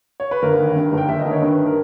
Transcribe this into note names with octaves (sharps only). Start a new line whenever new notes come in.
C#5
B4
G1 A#4
D#3
G2
G1
G5
G1 E5
D#5
D#3
C#5
G2 B4
A#4